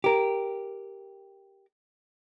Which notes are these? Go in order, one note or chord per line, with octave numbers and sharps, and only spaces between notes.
G4 A#4